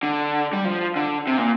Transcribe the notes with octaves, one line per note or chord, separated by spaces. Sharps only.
D3
G3
F3
D3
C3
A#2